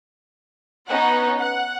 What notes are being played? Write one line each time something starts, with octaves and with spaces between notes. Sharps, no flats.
B3 C#4 D#4 F#5
F#5